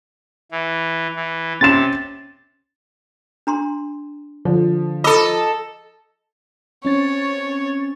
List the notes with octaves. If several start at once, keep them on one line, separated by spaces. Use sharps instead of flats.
E3
E3
C3 C#4 C6 A6 E7
D4 A#5 C6
D3 F3
A4 D#5 B5 D6 E6
C4 C#4 C#5 A6